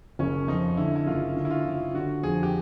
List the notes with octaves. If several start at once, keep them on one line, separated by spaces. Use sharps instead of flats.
F#1 C#4
F2 D#4
D3 E4
E4
F#1 F4
D3
E4
F4
F#1
D3 F#4
F2 G#4
G4